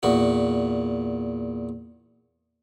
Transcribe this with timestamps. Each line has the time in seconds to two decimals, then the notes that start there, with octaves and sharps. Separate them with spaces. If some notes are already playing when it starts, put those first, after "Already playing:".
0.03 E2 A#2 F#4